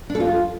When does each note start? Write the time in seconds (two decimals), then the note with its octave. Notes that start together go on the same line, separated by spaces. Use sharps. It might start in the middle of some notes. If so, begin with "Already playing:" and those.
0.10 D4
0.15 A4
0.20 F4